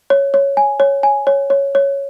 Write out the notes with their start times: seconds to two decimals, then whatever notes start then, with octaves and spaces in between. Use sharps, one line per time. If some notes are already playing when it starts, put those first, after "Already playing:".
0.10 C#5
0.34 C#5
0.57 G#5
0.80 C#5
1.03 G#5
1.27 C#5
1.50 C#5
1.75 C#5